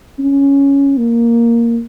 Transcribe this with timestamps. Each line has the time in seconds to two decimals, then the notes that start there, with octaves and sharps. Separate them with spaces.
0.19 C#4
0.97 A#3